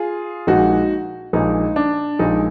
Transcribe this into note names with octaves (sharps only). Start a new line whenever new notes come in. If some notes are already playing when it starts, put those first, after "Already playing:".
Already playing: F4 G#4
A#1 A#2 G#3 D#4 F#4
A#1 A#2 G#3 D#4
D4
A#1 A#2 G#3 D#4